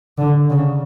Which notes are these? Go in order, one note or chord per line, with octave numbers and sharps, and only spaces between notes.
D3
C#3